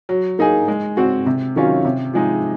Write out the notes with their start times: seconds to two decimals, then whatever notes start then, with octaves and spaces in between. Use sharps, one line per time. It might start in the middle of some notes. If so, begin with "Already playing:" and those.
0.09 F#3
0.39 A#3 D#4 G#4
0.68 G#3
0.97 C4 F#4
1.26 C3
1.56 D#3 F#3 C#4 F4
1.85 C3
2.14 F3 G#3 D#4